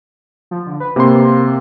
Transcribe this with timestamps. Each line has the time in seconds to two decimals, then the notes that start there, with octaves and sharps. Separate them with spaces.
0.51 F3
0.66 D3
0.80 B4
0.96 C3 A#3 C6